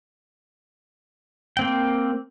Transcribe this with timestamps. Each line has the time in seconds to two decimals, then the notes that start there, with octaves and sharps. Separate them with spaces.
1.57 A#3 C4 G5